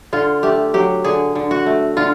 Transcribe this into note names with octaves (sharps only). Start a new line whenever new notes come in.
D3 F4
A3 G4
F#3 G4
D3 G#4
D3
F#4
A3
D3 F4